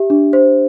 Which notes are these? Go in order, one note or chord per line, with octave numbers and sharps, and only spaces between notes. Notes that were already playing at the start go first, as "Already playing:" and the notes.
Already playing: G4 E5
D4
C5